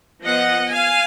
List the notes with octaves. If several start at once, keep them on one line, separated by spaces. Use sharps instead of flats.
F3 B3 D#5 F#5
F5 G#5